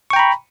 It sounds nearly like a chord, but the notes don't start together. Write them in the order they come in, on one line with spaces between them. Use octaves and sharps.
C#6 G5 A#5 B5